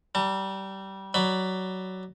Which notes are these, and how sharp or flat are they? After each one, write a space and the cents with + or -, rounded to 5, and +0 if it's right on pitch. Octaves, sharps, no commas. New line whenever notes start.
G3 -20 A5 +40
F#3 +15 D5 +10 B5 +5